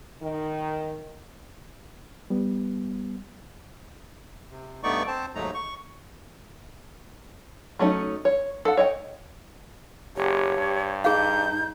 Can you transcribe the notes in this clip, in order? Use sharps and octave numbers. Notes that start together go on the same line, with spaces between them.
D#3
G3 B3
C3
G2 A3 B3 D#4 D5 C#6
C4 C5 A5
D#2 G#2 F#3 A3 D#4 A#5
C#6
F#3 A3 C#4 D#4
C#5
A4 F#5
C#5 D#5 G5
F#1 G4 C#5
G2
D#4 G#4 F5 G6